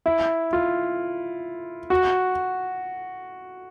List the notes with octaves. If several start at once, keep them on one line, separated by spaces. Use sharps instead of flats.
E4
F4
F#4